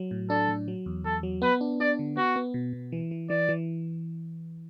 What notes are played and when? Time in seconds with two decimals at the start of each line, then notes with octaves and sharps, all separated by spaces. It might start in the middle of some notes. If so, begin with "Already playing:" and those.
Already playing: F#3
0.11 A2
0.30 D4 A4
0.49 A2
0.68 F#3
0.86 E2
1.05 E2 A4
1.23 F#3
1.42 B3 B4
1.61 D4
1.80 D4 D5
1.99 D3
2.17 B3 F#4
2.36 B3
2.54 B2
2.73 B2
2.92 E3
3.11 E3
3.30 E3 D5
3.49 E3